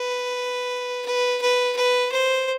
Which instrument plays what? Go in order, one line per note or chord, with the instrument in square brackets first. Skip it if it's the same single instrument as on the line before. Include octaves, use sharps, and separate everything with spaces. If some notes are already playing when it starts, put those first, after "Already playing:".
Already playing: [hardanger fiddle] B4
B4
B4
B4
C5